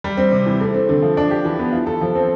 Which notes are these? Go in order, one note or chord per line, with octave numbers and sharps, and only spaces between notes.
G3
C4
C3
E3
A3
C4
D3
F3
D4
G4
E3
B3
F4
A4
F3
C4